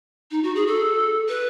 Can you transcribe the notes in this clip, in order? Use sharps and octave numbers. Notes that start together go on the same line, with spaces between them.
D#4
F#4
G#4
A4
B4